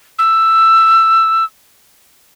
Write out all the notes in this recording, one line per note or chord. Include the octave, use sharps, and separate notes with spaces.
E6